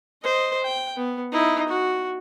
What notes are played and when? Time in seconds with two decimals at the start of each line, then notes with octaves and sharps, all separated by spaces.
0.23 C5 D#5
0.63 G5
0.96 B3
1.32 D#4 E4
1.68 F#4